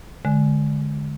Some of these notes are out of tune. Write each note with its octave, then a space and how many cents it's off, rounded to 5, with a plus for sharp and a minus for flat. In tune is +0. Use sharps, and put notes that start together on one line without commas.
D3 +0 G#3 +20